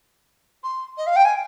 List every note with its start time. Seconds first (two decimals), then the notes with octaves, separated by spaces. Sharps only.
0.63 C6
0.97 D#5
1.06 F5
1.16 G5
1.25 G#5